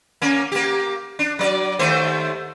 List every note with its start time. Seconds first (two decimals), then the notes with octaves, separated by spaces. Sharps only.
0.22 A#3 C#4
0.52 A#3 G4
1.19 D4
1.39 F#3 D5
1.79 D#2 A3 C5